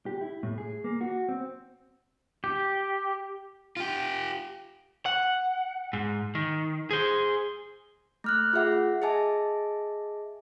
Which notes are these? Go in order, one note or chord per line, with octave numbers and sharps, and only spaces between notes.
G4
E4
A2
G#4
A#3
F#4
C4
G4
F4 G4
F#5
G#2
D#3
G#4 C5
A3 F6 F#6
F4 G#4 E5 F#5
G#4 D#5 E5 G#5 A5